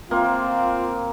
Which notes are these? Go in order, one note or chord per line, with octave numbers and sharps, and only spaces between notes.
A#3 C4 F4